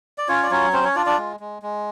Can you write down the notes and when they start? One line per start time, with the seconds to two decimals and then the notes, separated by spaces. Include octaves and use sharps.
0.18 D5
0.28 C#4 F4 C#5
0.43 D5
0.51 F#3 C#4 C#5
0.73 C4 C#4 C5
0.84 C#4 C#5
0.95 D4 F4 D5
1.06 D4 D5
1.18 G#3
1.40 G#3
1.62 G#3